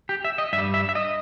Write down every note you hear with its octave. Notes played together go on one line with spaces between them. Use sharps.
G4
E5
D#5
G2 E5
G3
E5
E5
D#5